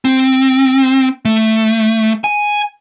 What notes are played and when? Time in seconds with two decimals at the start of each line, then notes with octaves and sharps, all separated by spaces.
0.05 C4
1.25 A3
2.24 G#5